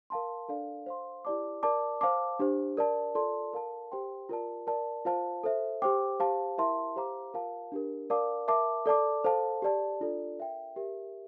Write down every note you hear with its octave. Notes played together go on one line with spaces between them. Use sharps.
A#4 F5 A5 C6
D4 A4 D5 F5
C5 F5 C6
E4 G4 D5 A5 D6
A#4 D5 A5 D6
C5 F5 A5 D6
D4 G4 C5
A#4 D5 A5
F4 A4 D5 A5 C6
A#4 F5 A5
G4 C5 G5 C6
F4 A#4 D5 A5
A#4 D5 A5
F4 C5 F5 A5
A4 C5 E5
G4 C5 G5 D6
G4 C5 F5 A5
E4 A#4 E5 A5 C6
G4 C5 F5 A#5 D6
F4 A#4 F5 A5
D4 G4 A#4
A#4 D5 F5 A5 D6
A#4 E5 A5 D6
A4 D5 A5 D6
A4 C5 F5 A5
G4 D5 A5
D4 F4 A4 D5
A#4 E5 G5
G4 A#4 E5